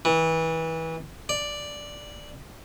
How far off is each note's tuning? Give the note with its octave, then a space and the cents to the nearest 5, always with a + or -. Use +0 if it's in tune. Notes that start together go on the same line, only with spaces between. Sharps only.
E3 -25
D5 +0